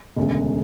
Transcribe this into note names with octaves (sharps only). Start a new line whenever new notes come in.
E1 D2 C#3 G#3